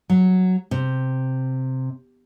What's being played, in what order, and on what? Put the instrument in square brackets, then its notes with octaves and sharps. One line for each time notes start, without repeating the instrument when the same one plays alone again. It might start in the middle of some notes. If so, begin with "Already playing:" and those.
[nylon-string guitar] F#3
C3